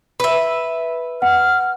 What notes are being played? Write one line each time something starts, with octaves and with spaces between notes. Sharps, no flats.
B4 E5
F#5 F6